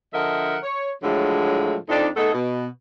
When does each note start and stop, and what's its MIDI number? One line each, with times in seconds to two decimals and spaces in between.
0.14 0.57 50
0.14 0.57 53
0.14 0.57 70
0.14 0.57 75
0.14 0.57 76
0.14 0.57 78
0.63 0.91 73
1.03 1.75 45
1.03 1.75 50
1.03 1.75 53
1.03 1.75 54
1.03 1.75 56
1.03 1.75 57
1.89 2.07 41
1.89 2.07 62
1.89 2.07 63
2.17 2.34 57
2.17 2.34 59
2.17 2.34 63
2.17 2.34 68
2.17 2.34 69
2.34 2.66 47